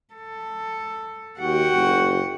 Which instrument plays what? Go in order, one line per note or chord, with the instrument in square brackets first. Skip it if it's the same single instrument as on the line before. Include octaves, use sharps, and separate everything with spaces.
[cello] A4
[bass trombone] D#2 [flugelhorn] F#4 [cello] F#5 G5
[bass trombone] F#1